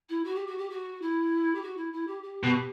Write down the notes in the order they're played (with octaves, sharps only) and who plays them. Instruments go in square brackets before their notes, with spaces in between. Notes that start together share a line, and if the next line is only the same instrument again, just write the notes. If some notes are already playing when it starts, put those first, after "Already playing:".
[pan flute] E4
F#4
G4
F#4
G4
F#4
E4
G4
F#4
E4
E4
G4
G4
[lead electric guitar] B2